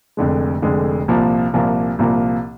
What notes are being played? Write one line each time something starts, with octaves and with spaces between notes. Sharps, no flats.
F1 F2 D3 G#3
F1 F2 D3 G#3
C2 A#2 F3 A#3
C2 A#2 F3 A#3
C2 A#2 F3 A#3